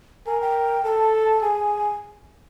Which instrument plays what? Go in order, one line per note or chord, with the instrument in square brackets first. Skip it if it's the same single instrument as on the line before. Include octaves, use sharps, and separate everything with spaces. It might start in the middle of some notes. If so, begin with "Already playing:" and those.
[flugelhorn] A#4 [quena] G#5
[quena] G5
[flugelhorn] A4 [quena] A5
[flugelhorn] G#4 [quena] G#5